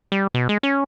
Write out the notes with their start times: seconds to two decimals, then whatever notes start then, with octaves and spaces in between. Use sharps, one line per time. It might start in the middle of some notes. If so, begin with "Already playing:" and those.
0.12 G3
0.34 B2
0.49 G#3
0.63 C#4